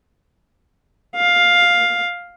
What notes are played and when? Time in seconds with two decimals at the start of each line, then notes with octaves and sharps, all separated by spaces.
1.16 F5